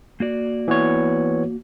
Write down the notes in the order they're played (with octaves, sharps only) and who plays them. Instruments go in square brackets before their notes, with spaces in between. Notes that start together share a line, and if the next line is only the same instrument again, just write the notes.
[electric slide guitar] A#3 F#4 D5
[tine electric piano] E3 B3 C#5